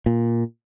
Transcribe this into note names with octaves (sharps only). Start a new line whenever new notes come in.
A#2